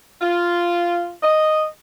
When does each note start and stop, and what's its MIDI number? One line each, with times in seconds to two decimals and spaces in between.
0.22 1.12 65
1.23 1.64 75